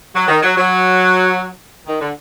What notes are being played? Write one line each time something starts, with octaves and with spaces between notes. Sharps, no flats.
F#3
D#3
F#3
F#3
D#3
D3